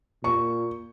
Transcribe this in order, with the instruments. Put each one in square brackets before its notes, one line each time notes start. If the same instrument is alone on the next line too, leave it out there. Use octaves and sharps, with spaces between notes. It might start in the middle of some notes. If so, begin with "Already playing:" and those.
[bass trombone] A#2 [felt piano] C#6